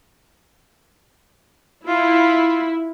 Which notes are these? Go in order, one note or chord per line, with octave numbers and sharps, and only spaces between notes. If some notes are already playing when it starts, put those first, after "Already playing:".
E4 F4